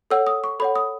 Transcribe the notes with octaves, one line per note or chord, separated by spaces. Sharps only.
A4 C#5 F#5 E6
D#6
C#6
A4 C#5 F#5 B5
D#6